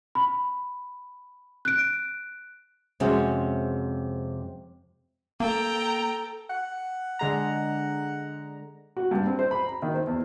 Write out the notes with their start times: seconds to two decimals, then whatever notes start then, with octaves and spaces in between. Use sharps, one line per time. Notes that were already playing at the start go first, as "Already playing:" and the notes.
0.15 B5
1.65 F#6 D7
3.00 F2 C3 G#3 C#4 F#4
5.40 A#3 A4 G5 A#5
6.50 F#5
7.19 D3 G#3 A#5
8.97 F#4
9.11 G2
9.27 C4
9.39 C5
9.51 B5
9.66 A#5
9.82 D#3
9.94 C5
10.07 E2